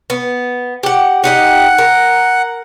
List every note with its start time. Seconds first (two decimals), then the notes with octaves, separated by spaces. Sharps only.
0.10 B3
0.83 G4 F#5
1.24 D#4 G4 D#5 F#5
1.78 A#4